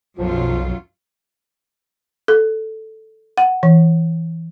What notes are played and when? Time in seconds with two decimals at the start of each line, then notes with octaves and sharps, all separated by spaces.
0.18 B1 F#2 F3 F#3 F4
2.28 A4
3.38 F#5
3.63 E3